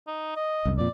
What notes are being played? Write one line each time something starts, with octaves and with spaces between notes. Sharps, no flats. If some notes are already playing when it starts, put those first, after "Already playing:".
D#4
D#5
C2 F#2
F2 A#2 D5